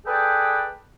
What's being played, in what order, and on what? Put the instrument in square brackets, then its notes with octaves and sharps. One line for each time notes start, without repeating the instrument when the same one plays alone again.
[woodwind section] G#4 A4 B4 D5 G5